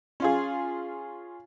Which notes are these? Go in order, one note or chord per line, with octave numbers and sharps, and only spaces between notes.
C#4 F4 G#4